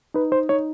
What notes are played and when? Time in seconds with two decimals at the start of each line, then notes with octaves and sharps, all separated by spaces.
0.14 D#4 B4
0.32 C5
0.49 D#4 C#5